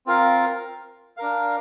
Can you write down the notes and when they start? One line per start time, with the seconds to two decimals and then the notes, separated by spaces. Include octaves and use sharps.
0.06 C4 F4 A#4 F5
1.17 D4 A#4 F5